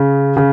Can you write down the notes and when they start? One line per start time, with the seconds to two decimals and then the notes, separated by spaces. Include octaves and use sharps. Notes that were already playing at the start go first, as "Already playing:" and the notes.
Already playing: C#3
0.37 C#3